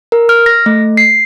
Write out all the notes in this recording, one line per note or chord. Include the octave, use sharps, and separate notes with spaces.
A#4
F6
A#6
A3
C7